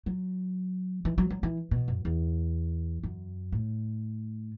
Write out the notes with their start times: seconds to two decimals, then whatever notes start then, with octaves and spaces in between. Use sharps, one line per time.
0.06 F#3
1.05 E3
1.18 F#3
1.30 F#3
1.43 E3
1.71 B2
1.88 F#2
2.05 E2
3.03 F#2
3.52 A2